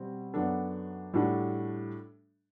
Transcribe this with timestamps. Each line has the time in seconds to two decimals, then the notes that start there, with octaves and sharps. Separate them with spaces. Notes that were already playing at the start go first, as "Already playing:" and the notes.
Already playing: B2 G3 C4
0.34 F#2 F#3 B3 D4 A4
1.14 A2 G3 D4 F#4 A4